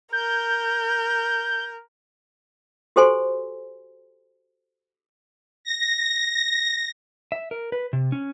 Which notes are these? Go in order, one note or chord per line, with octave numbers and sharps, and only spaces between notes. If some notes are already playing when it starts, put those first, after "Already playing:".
A#4 G6
F#4 G4 A4 C5 G#5 C6
A#6
E5
A#4
B4
C3
C#4